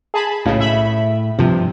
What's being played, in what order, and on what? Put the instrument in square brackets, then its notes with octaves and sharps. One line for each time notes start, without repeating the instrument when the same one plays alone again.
[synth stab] G#4 A5 B5
[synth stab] B1 C#3 [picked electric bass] A2
[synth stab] E5 B5
[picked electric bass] G2 F3 [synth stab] C3